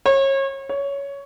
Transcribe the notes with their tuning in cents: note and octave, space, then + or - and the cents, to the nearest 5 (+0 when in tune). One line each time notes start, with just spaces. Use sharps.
C#5 -30
C#5 +15